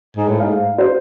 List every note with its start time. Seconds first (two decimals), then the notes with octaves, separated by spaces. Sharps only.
0.17 G#2
0.28 A2
0.39 G#2 F5
0.78 C5